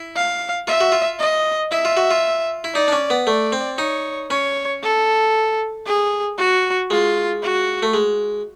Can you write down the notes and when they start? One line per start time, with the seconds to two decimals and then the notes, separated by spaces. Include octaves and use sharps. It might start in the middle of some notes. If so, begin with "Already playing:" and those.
Already playing: E4
0.16 F5
0.67 F4 E5
0.80 F#4
0.92 F4
1.19 D#5
1.71 E4 E5
1.85 F4
1.97 F#4
2.11 F4
2.64 E4
2.75 D#4 D5
2.88 D4
2.92 C#4
3.10 B3
3.27 A3 D5
3.52 C4
3.78 D#4 C#5
4.30 C#4 C#5
4.83 A4
5.86 G#4
6.38 F#4
6.90 G#3 F4
7.43 F#4
7.83 A3
7.94 G#3